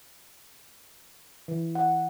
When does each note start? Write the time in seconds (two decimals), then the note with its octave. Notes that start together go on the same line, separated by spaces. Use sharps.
1.48 E3
1.75 F#5